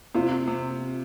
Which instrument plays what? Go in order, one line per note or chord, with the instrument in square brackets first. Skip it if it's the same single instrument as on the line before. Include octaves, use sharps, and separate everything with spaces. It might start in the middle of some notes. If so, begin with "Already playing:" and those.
[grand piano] C3 [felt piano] F4
[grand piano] C3